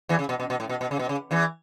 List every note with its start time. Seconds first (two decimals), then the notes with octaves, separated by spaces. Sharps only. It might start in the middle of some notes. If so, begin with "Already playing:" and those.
0.09 E2 E3
0.19 C#3
0.29 B2
0.40 B2
0.50 B2
0.60 A2
0.69 B2
0.81 B2
0.91 C#3
0.99 B2
1.09 C#3
1.31 E2 E3